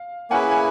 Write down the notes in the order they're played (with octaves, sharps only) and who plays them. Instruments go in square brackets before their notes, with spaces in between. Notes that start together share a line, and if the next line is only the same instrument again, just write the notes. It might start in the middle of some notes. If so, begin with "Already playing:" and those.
Already playing: [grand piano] F5
[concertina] A#3 C#4 E4 G#4 B4 [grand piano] F#5 G#5
[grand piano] G#5